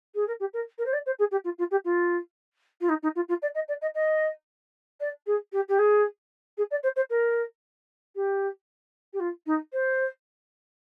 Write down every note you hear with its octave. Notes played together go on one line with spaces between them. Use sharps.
G#4
A#4
G4
A#4
A#4
C5
D5
C5
G#4
G4
F4
F4
G4
F4
F4
D#4
D#4
F4
F4
D5
D#5
D5
D#5
D#5
D5
G#4
G4
G4
G#4
G#4
D5
C5
C5
A#4
G4
G4
F4
D#4
C5